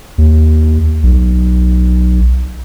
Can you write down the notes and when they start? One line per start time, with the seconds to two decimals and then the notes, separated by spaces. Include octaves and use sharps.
0.18 D#2
1.03 B1